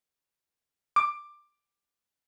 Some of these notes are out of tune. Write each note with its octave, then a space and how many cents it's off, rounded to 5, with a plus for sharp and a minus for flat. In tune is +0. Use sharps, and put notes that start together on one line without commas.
D6 +15